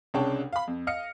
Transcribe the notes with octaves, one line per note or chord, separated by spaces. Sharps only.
C2 C#3 D4 C#5 G5 A5
F5 B5
F2
D#5 F5 F6 C#7